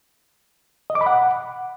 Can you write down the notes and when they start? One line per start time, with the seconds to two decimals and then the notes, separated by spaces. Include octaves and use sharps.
0.90 D#5
0.95 D6
1.01 B5
1.06 F#5